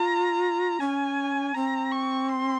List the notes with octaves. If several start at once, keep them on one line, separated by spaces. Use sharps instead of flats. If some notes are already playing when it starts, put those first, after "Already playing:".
Already playing: F4 A#5
C#4 G#5
C4 A#5
C#6
C6